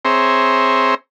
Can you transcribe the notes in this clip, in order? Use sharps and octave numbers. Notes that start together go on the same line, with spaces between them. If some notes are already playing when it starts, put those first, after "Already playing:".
C4 G#4 C5 C#5 E5 A#5